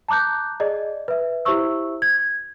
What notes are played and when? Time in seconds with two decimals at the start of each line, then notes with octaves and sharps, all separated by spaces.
0.08 A5 A#5 D6 F#6 G6
0.60 G#4 D5 D#5
1.08 B4 E5
1.45 E4 G4 C5 E5 C#6 E6
2.02 G#6